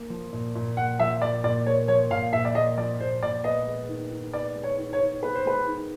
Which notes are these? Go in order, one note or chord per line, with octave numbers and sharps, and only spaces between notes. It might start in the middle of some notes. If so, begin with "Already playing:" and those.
Already playing: A#3
F3
A#2
A#2
A#3 F#5
F3 E5
A#2 D5
A#2 D5
A#3 C#5
F3 C#5
A#2 F5
A#2 E5
D5
A#3 D#5
F3 D5
A#2 C5
A#2 D5
B3 D#5
G#3
D#3
D#3
B3 D5
G#3
C#5
D#3
C#5
D#3
B3 B4
C5
G#3 B4
D#3